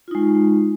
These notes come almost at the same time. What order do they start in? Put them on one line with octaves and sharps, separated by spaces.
F4 D#4 G#3